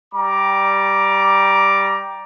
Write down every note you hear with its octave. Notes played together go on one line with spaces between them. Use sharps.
G3 A#5 D6